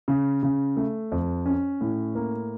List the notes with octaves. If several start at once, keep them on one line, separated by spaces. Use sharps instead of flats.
C#3
C#3
A3
F2
C#4
A2
A#3